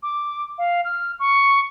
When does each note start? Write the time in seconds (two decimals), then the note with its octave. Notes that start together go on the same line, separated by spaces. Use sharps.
0.03 D6
0.58 F5
0.85 F6
1.20 C#6